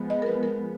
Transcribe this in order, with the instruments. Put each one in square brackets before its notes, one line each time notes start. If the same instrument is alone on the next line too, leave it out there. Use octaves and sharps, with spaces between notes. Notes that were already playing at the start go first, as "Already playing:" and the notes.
Already playing: [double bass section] F3 G#3 B3
[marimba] D#5
A#4
B4
A#4